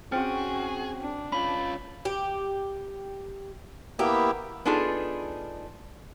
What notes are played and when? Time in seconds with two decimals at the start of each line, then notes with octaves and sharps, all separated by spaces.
0.12 C4 C#4 F#4 G#4 C5 G5
1.00 D4
1.32 C#4 F4 B5
2.05 G4
3.99 A#3 B3 E4 G4
4.65 B3 D4 D#4 F4 G#4 A4